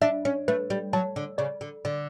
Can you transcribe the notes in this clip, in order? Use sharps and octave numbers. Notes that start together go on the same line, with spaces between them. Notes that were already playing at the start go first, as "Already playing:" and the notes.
D4 E5
C#4
A3 B4
G3
F#3 A5
D3
C#3 D5
D3
D3 D5